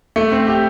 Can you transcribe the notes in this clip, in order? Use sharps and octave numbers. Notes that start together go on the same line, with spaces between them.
A3
C4
G4